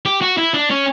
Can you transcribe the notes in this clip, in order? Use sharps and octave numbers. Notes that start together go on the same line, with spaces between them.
G4
F#4
E4
D4
C#4